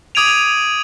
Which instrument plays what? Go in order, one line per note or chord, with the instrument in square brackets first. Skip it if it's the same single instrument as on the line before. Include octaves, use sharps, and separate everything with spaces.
[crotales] D6 D#6 G#6 D7 D#7 F7